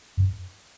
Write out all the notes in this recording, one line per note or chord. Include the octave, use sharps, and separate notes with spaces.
F#2